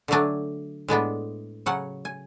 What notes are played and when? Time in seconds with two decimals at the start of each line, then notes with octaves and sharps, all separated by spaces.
0.08 D3 F#3 A3 D4 G#5
0.88 A2 G#3 B3 D4
1.66 C#3 F#3 C#4 F#5
2.05 G#5